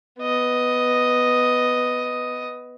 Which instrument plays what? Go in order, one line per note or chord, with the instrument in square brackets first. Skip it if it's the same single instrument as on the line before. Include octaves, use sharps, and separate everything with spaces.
[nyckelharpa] B3 D#5